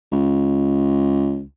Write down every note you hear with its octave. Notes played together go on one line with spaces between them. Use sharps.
C#2